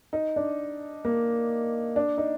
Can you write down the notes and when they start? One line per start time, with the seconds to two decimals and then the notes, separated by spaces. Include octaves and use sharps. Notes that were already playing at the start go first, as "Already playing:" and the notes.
0.13 D#4
0.36 D4
1.05 A#3
1.96 D4
2.18 D#4